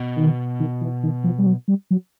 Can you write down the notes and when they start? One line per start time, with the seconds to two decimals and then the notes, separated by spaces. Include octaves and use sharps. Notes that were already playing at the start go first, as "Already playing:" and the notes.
Already playing: B2
0.16 D#3
0.60 D#3
0.81 E3
1.03 D#3
1.24 F3
1.39 G3
1.46 F#3
1.68 G3
1.91 F#3